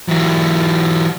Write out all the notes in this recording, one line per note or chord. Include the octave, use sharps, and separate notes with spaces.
E3 F#3